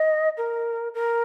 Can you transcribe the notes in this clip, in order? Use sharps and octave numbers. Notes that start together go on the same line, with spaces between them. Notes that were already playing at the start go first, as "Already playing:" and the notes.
Already playing: D#5
A#4
A#4